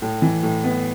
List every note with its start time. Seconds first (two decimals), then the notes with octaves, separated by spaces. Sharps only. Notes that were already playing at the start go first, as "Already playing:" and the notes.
0.02 A2
0.22 E3
0.43 A2
0.64 B3